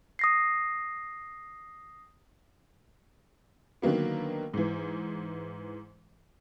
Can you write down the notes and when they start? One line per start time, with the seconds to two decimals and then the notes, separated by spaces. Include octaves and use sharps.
0.19 D#6 A#6 C7
3.82 D3 D#3 F#3 A#3 B3
4.54 G#2 E3